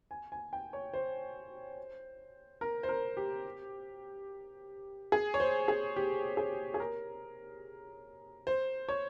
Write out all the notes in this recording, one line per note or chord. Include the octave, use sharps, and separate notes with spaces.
G#5
G#5
G5
C#5
C5
A#4
C5
A#4
G4
G#4
C#5
C5
G#4
G4
G#4
G#4
A#4
C5
C#5